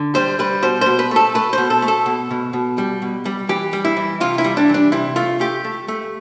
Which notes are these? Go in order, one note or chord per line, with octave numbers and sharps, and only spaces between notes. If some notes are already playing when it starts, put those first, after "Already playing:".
Already playing: D3
G3 C5
G3 B4
B2 C5
B2 C5
B4
A3 A4
A3 B4
C5
B2
A4
A3
A4
B2
B2
B2
G3
B2
G3
E3 G4
G3
E4
E3
C3 F4
E4
G3
D4
E3 D4
C3 E4
A3 F4
A3 G4
A3
A3